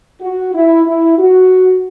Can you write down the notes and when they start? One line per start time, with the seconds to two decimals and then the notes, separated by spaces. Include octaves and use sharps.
0.21 F#4
0.54 E4
0.86 E4
1.18 F#4